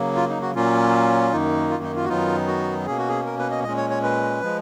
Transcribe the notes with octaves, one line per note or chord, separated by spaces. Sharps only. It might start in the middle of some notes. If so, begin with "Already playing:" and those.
Already playing: C#3 F#3 A#3
F4
D#4
F#4
A#2 F#3 A#3 C#4 F4
F#2 D#3 A#3 D#4
F4
D#4
F4
F#4
F#2 D#3 F#3 B3 D#4 F4
F#4
B2 A#3 C#4 G#4
F#4
G#4
A#4
B4
D#5
A#2 G#3 C#4 D#5
C#5
C#5
B4
F3 G#3